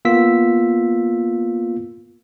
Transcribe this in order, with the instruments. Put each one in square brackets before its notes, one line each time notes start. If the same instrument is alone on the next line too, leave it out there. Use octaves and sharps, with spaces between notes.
[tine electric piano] A#3 B3 F4 E6 B6